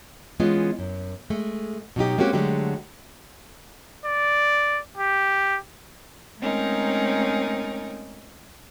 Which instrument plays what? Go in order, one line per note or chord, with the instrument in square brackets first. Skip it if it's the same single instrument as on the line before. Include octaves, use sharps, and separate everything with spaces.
[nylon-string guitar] E3 G#3 B3 C#4 F4
F#2
G#3 A3
B2 F#3 D#4 G4
G#3 A#3 C4 C#4 F#4 G4
D3 F#3 G#3 A3 G4
[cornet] D5
G4
[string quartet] G#3 A3 C4 C#4 D#4 A#4